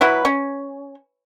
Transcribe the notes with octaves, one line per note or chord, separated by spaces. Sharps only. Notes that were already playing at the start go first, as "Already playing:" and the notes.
F#3 E4 B4
C#4